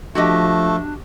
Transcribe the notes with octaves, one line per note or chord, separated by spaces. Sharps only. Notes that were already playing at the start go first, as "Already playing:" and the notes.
F3 A3 D4 F#4 G4 D#5